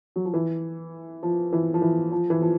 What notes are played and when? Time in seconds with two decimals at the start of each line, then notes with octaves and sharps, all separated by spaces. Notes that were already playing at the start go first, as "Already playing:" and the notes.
0.16 F#3
0.25 F3
0.33 E3
1.23 F3
1.53 E3
1.74 F3
1.82 E3
2.12 F3
2.30 E3
2.42 F3